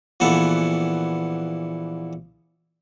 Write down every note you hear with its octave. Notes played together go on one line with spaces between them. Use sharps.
A#1 A#2 E3 B3 A4 F#5